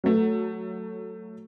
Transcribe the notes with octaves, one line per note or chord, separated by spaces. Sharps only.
F#3 A3